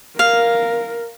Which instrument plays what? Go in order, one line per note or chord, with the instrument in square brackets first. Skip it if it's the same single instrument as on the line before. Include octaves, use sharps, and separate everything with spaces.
[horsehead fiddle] A#4 [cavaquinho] F5